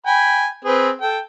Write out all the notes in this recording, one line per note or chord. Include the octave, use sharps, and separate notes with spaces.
G5 G#5 B5
C4 G#4 B4
A4 G5